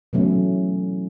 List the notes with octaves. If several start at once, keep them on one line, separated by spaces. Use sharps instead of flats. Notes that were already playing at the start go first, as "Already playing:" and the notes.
B2 E3 F#3 A3 C#4